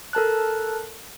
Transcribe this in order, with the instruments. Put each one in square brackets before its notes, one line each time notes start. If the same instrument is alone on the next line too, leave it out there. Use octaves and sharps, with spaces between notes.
[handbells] A4 A#4 A5 F#6